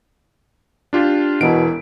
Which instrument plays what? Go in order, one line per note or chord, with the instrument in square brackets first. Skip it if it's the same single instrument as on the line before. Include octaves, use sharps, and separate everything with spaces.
[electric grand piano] D4 F4 G4
[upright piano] E1 E3 [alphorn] B2 [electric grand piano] D7